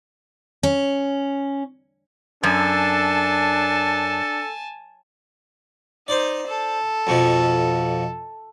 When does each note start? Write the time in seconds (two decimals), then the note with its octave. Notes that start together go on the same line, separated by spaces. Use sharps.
0.63 C#4
2.43 F#2 D4 A4 G#5 A5
6.08 D#4 C5 D5
6.47 A4
7.07 F2 B2 F3